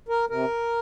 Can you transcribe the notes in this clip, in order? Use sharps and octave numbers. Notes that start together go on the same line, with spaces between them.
A#4
C3 A#4